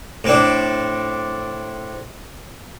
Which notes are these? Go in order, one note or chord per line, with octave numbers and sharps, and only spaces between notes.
A2 C4 D4